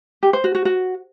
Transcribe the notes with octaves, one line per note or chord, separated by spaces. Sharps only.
G4
C5
F#4
F#4
F#4